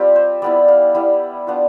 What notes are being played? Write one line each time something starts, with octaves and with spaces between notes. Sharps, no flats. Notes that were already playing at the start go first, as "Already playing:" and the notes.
Already playing: G3 C4 F4 G4
C5
G3 B3 E4 D5
F5
G3 B3 E4
B3 D4 F4